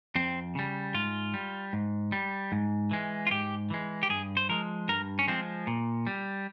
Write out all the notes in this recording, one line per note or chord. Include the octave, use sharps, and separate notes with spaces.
F2 C4
C#3 G3
G#2 F4
G3
G#2
G3
G#2
E3 G#3
F4
G#2 G4
E3 G#3
G4
G2 G#4
C5
F3 G#3 A#4
G2 A#4
C#4
F3 G#3 C4
A#2
G3